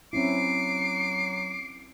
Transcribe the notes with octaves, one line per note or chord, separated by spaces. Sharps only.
F#3 C4 C#4 E4 D6 C7